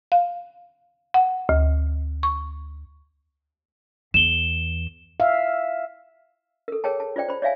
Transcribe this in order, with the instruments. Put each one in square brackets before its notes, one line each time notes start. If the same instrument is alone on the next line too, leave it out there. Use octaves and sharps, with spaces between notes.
[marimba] F5
F#5
D2
C#6
[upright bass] E2 [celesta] E7 G7
[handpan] E5 F5
[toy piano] A4 A#4
G#4 A#4 C#5 G5 A5
A5
F4 C5 D5 G5
C5 B5
C#5 D5 E5 F5 G#5